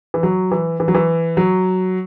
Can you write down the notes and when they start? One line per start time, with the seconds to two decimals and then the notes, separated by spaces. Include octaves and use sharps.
0.14 E3
0.23 F#3
0.51 E3
0.80 E3
0.88 F#3
0.94 E3
1.37 F#3